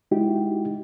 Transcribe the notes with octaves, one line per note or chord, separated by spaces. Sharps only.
G#3 D#4 E4 F#4 G4